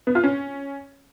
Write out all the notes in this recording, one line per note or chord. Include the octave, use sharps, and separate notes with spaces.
B3
F4
C#4